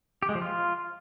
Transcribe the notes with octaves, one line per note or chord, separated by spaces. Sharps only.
G4
G#3
F3
F4